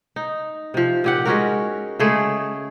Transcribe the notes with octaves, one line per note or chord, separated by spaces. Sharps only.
D#4
C3 F3
A#2 G4 F#5
G#3 C#4 F#4 A#4
C#3 G#3 A3 G#4